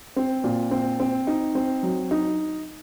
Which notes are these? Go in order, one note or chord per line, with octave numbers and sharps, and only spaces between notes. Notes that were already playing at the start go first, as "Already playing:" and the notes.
C4
A#2
C4
C4
D#4
C4
F#3
D#4